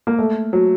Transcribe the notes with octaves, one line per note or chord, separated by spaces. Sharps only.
A#3
A3
F#3